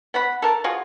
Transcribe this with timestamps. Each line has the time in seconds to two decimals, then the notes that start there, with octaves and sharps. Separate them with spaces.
0.14 B3 F#5 B5
0.42 A4 A#4 A5
0.64 F4 F#4 G#4